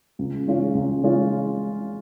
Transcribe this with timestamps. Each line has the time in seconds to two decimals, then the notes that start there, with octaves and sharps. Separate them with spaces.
0.19 C#2
0.47 C#3 G#3 C#4 F4
0.75 C#2
1.02 C#3 G#3 C#4 F4